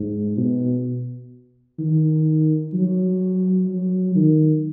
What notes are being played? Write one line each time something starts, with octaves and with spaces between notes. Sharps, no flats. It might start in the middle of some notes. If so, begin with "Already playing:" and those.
Already playing: G#2
B2
D#3
F#3
F#3
D#3